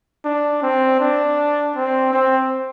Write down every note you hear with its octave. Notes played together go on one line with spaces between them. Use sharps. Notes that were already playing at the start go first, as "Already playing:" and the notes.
D4
C4
D4
C4
C4